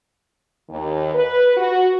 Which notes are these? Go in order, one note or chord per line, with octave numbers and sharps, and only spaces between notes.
D#2
B4
F#4